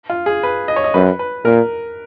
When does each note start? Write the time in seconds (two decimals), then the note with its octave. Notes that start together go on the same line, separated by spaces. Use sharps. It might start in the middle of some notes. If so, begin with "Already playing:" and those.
0.10 F4
0.26 G#4
0.43 B4
0.68 D#5
0.76 C#5
0.84 D#5
0.94 F#2 B4
1.19 B4
1.44 A#2 A#4